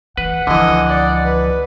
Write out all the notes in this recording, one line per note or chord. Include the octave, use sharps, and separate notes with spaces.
E3 B4 F#5
C#2 D3 E3 F3 D#5
D5
B4